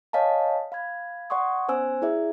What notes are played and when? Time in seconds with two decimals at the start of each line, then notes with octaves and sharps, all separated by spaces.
0.13 C#5 D#5 F5 G#5 A5
0.72 F5 B5 G#6
1.30 D5 F#5 C6 C#6 D#6
1.68 B3 C#4 C5 G#5 E6
2.02 E4 G#4 D5 E5